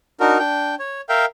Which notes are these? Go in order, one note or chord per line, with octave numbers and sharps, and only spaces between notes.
D4 D#4 F#4 A#4
D4 G5
C#5
A#4 E5 F5 G5